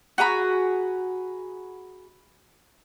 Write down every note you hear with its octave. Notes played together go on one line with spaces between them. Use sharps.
F#4 G#4 A#5 B5